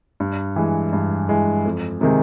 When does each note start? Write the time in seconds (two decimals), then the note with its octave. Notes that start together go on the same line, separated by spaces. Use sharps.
0.20 G2
0.56 E3 G#3
0.93 G2
1.29 E3 G#3
1.65 F2
2.01 C3 D#3 G#3